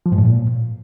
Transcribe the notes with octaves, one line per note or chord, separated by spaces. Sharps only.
F3
G#2
A2
A#2